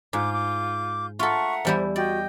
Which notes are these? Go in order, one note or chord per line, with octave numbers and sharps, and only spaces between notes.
G#2 F4 D6 G6
D6
F4 A4 E5 F#5 A#5 C#6
E2 G3 E4 C5
F#4 D5 D#5 G5